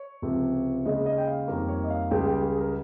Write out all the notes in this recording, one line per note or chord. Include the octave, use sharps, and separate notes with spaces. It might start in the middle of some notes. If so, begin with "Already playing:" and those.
Already playing: C#5
C#2 C3 F3
D#2 C#3 G#3 D#5
D#5
G5
F5
F2 D#3 G3 A#3
C#5
D#5
F5
C#2 C#3 G3 G5
G5
G#4
A#4